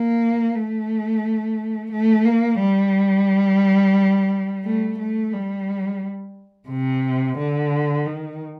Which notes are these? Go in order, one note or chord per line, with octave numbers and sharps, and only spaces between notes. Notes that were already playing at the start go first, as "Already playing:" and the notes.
Already playing: A#3
A3
A3
A#3
G3
A3
A3
G3
C3
D3
D#3